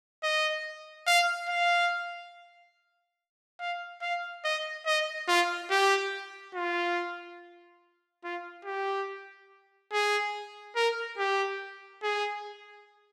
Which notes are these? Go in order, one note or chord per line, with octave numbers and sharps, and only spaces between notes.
D#5
F5
F5
F5
F5
D#5
D#5
F4
G4
F4
F4
G4
G#4
A#4
G4
G#4